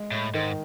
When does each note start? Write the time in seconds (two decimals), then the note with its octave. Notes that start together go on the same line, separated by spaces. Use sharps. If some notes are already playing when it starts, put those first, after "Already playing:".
Already playing: G#3
0.11 A2
0.34 G#2 D#3